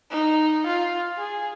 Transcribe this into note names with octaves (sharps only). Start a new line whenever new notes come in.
D#4
F4
G#4